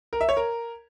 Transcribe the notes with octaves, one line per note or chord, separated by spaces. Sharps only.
A#4
E5
C#5
A#4